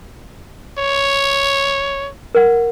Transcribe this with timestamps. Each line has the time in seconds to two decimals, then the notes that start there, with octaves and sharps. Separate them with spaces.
0.78 C#5
2.35 A#4 F#5